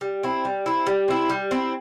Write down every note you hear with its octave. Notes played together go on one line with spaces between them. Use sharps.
G3
C4 E4
G3
C4 E4
G3
C4 E4
G3
C4 E4